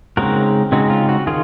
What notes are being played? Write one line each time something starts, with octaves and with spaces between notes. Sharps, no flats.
C#3 G#3 C4 D#4 F#4 A#4
C#3 G#3 C4 D#4 F#4
F4
F#4
D#3 F4 G#4